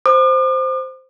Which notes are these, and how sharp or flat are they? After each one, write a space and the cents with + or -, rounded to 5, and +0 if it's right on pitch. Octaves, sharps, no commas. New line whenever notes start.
C5 -5 D6 +45